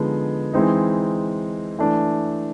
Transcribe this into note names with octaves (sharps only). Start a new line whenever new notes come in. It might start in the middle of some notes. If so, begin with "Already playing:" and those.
Already playing: D3 F3 G#3 B3 D#4
E3 G#3 C4 D#4
E3 A3 D4